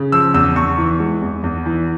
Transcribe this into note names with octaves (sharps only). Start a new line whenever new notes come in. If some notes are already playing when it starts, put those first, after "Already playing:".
Already playing: C#3
F3 E6
E2 E6
E2 C#6
E3
G#3
E2
E2
E3